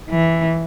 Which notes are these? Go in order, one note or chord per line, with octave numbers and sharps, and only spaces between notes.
E3